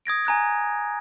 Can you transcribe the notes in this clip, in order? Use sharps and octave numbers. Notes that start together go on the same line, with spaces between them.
D#6 G#6 A#6 D7
G#5 A#5 F#6 G#6